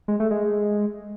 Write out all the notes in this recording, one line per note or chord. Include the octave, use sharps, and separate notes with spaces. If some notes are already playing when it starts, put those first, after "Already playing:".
G#3
A3
G#3